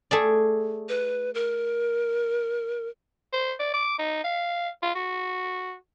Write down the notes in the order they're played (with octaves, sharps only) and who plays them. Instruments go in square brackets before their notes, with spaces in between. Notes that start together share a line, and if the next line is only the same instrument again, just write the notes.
[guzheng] A3 G#4 D5
[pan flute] B4
A#4
[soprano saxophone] C5
D5
D6
D#4
F5
F4
F#4